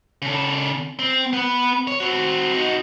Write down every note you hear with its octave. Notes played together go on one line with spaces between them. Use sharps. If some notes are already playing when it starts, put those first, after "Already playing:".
C#3 A4
C4
B3 B4
C#5
C4 F#4
D#4 F#4